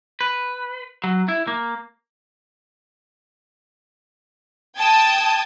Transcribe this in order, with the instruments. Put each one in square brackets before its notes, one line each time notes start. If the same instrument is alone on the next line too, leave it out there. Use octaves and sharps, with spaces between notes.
[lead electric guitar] B4
F#3
E4
A#3
[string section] G5 A5 D#6 G#6